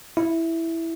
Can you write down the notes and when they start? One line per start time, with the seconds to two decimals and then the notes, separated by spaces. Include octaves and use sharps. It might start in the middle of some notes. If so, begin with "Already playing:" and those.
0.17 E4